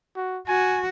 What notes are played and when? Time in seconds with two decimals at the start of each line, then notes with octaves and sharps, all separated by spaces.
0.16 F#4
0.48 F#4 G#5